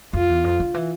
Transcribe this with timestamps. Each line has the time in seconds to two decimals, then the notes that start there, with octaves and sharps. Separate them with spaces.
0.13 F2 F4
0.29 E2
0.44 F2
0.60 D3
0.74 E3